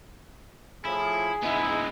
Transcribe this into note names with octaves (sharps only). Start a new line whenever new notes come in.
A2 F3 E4 G#4
G#3 B3 D#4 E4